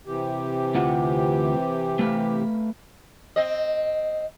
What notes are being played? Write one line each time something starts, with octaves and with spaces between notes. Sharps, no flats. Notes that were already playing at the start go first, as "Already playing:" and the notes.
C3 E3 G4
D2 F4 F#5
A3 B4 F5
C4 D#5